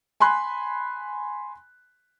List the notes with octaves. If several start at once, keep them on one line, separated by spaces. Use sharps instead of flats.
G#5 B5 C6 F#6